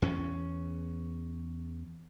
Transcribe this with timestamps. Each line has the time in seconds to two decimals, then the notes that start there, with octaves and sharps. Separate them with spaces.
0.02 E2 C#4